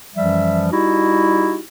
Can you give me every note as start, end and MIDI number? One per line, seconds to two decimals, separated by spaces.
0.15 0.67 42
0.15 0.67 52
0.15 0.67 53
0.15 0.67 55
0.15 0.67 76
0.71 1.59 55
0.71 1.59 63
0.71 1.59 64
0.71 1.59 66
0.71 1.59 67